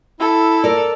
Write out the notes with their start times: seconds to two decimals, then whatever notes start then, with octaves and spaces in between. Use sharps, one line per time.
0.20 E4 A4
0.64 A#4 D5